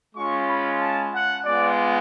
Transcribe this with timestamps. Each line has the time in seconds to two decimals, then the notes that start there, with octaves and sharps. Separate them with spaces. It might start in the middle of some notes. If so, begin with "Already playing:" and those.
0.15 G#3 C#4 F4 C#6
0.47 B5
0.79 A5
1.12 F#5
1.44 G#3 B3 F4 D5